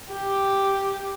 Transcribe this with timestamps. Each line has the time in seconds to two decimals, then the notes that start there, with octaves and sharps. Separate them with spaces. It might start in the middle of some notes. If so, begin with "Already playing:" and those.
0.10 G4